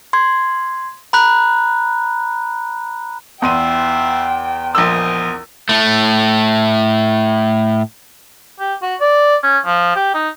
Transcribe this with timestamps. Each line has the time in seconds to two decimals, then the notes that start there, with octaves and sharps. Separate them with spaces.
0.13 C6 G#6
1.13 A#5 B5 F#6
3.42 E2 E3 F4 E5 G5 C6 D#7
4.75 A#1 A#4 C5 D#5 G#5 E6
5.69 A2 A3
8.60 G4
8.82 F#4
9.00 D5
9.43 C#4
9.66 F3
9.96 G4
10.14 D#4